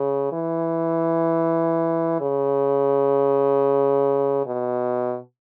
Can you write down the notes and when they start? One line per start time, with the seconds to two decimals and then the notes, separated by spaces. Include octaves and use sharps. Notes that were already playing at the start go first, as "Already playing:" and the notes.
Already playing: C#3
0.32 E3
2.21 C#3
4.46 B2